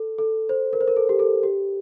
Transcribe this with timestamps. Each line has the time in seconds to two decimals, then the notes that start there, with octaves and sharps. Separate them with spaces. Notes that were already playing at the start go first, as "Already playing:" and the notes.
Already playing: A4
0.18 A4
0.49 C5
0.73 A#4
0.81 C5
0.88 A#4
0.97 A4
1.09 G4
1.19 A4
1.43 G4